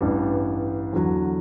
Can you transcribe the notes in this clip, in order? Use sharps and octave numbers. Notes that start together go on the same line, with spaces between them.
A1 G2 E3 G3
E2 D3 F#3